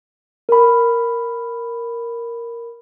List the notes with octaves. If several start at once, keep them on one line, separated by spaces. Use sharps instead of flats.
A#4 B5